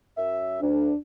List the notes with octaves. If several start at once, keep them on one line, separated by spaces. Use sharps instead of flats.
F#2 E5
D2 D4